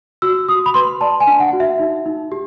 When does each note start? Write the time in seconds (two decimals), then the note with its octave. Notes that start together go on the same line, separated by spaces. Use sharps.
0.22 F#4 E6
0.48 F#4 D#6
0.66 B5
0.74 B4 C6
1.01 D5 A5
1.20 G#5
1.27 D4
1.40 F#5
1.53 F#4
1.60 E5
1.79 D#4
2.06 D#4
2.32 G4